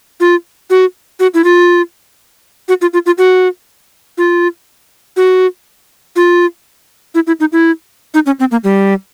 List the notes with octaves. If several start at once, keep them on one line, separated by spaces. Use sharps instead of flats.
F4
F#4
F#4
E4
F4
F#4
F4
F4
F4
F#4
F4
F#4
F4
E4
E4
D#4
E4
D#4
C#4
C4
A#3
G3